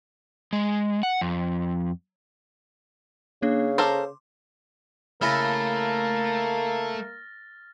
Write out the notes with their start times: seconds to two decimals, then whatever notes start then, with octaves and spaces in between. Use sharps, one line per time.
0.53 G#3
1.03 F#5
1.21 F2
3.42 C#3 A#3 D4
3.78 A4 A#4 C5 C6 D6
5.22 C#3 A3 A#3 E4 A4 F6 A6 A#6